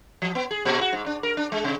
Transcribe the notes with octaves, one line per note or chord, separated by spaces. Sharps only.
F3
B3
G#4
A#2
F#4
G#2
D4
A#4
D4
G#3
C3